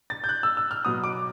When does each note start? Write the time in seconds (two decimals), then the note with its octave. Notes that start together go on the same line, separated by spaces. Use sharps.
0.10 A6
0.24 G6
0.29 F#6
0.43 E6
0.57 E6
0.71 F6
0.85 B2 F#3 B3 D#6
1.04 D6